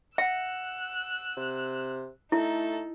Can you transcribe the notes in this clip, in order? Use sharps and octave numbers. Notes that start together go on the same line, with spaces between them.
E5 F#5 E6 F#6 C#7
C3
A3 D#4 E4 A4